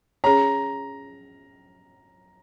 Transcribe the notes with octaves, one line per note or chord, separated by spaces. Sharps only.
C#4 G#4 C#5 A#5